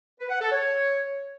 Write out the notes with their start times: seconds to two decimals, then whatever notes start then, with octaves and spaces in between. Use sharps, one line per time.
0.19 B4
0.30 F#5
0.40 A4
0.51 C#5